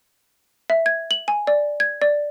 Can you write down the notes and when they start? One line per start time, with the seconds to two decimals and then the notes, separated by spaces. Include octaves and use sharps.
0.70 E5
0.86 G#6
1.11 F#7
1.28 G#5
1.47 D5
1.80 G#6
2.02 D5